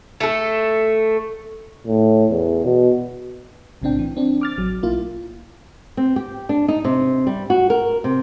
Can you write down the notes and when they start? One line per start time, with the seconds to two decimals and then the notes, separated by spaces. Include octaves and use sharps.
0.20 A3 A4
1.87 A2
2.31 E2
2.65 B2
3.82 B1 A2 C#3 C4 D4 G5
3.99 E3
4.17 C4 D4
4.41 D6 F6 A6
4.58 A1 F#3
4.83 B1 A#3 E4 F4
5.97 C4
6.16 G4
6.49 D4
6.68 D#4
6.84 C3
7.27 G3
7.50 F#4
7.70 A#4
8.04 C3